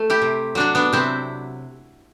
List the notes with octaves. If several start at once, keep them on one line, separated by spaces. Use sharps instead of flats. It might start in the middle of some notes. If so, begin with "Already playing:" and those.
Already playing: A3
E4 G4
C3
F#3 D4 F#4
B3 D4
C3 C4 E4